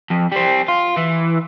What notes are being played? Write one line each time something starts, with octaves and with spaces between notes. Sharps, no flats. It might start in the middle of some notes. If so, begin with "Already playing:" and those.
F2
G3 C4
F4
E3